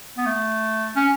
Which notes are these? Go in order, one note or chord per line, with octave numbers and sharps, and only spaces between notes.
B3
A3
C#4